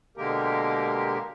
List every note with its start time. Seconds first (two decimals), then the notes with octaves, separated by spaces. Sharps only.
0.17 B2 D3 G#3 A#3 G4 A#4